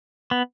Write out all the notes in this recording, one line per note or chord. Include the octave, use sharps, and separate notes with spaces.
B3